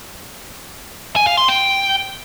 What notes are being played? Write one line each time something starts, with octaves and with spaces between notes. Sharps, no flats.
G#5
F5
C6
G5